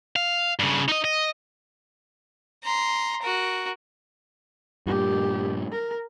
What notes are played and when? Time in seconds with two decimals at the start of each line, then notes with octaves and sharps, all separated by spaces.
0.16 F5
0.59 G2 C#3
0.88 D#4 D#5
1.04 D#5
2.63 A#5 C6
3.23 F#4 A#4
4.87 G2 A#2 G4
5.72 A#4